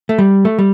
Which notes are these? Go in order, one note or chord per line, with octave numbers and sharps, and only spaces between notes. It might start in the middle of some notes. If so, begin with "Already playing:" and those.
A3
G3
A3
G3